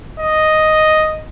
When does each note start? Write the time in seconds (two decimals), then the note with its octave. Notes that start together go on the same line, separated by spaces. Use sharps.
0.20 D#5